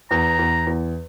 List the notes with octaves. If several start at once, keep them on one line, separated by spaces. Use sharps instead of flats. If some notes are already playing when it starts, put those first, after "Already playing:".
E2 A#5
E2
E2